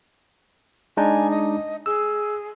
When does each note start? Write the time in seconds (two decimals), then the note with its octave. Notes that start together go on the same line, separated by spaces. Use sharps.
0.97 G#3 D4 D#4 G#5
1.30 D#5
1.86 G#4 E6